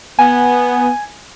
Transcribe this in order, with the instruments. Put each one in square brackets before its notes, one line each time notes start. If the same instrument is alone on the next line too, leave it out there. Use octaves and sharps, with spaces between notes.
[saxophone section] B3 [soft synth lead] G#5